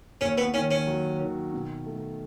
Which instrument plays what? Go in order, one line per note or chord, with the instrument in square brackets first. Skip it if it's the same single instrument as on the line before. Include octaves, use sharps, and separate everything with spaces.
[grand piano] D#2 [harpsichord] C#4
[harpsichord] B3
[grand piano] D#3 [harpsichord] C#4
[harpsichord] C#4
[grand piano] F#3
D#3
B2
A3